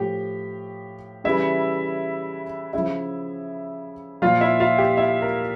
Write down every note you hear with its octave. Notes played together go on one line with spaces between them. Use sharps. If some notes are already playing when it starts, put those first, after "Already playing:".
Already playing: A2 F3 G4 G5
C#3 E3 G3 E4 E5
C#3 F3 E4 E5
A#2 F3 F4 F5
E4 E5
F4 F5
G4 G5
E4 E5
A#4